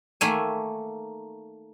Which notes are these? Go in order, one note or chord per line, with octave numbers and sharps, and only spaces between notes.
D#3 A3 A#3 E5 G#5